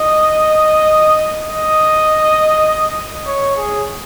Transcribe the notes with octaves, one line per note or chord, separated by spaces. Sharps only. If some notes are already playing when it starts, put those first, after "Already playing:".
Already playing: D#5
D#5
C#5
G#4